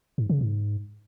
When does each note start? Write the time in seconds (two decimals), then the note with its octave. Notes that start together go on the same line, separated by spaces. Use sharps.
0.18 G#2
0.30 C#3
0.41 G#2